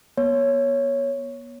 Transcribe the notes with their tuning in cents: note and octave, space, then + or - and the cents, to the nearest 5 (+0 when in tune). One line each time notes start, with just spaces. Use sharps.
B3 -35 C#5 +0